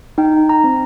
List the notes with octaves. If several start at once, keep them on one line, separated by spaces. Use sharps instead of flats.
D#4 G5
A#5
C4